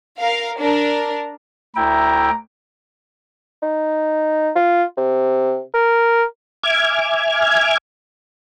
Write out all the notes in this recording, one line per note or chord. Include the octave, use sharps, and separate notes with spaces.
A#4 F5
D4 A#4
D2 E4 G5 A#5
D#4
F4
C3
A#4
E5 G#5 D6 F6 G#6